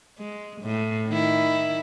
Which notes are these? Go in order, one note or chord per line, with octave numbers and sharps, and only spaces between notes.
G#3
A2
D#3 E4